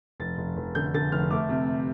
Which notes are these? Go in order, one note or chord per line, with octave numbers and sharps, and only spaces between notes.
F1 A6
F1
F1
D3 G6
D3 A6
F1 F6
A3 D6
C3